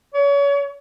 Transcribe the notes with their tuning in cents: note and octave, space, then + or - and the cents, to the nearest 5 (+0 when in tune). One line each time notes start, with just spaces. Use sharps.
C#5 +35